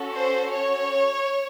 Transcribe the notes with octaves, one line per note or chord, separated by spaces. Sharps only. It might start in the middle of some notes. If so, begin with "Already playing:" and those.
Already playing: C#4 F#4 A4
C5
C#5